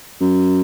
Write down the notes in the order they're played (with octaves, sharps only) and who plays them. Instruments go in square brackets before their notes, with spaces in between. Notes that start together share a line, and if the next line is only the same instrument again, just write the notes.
[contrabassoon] F#2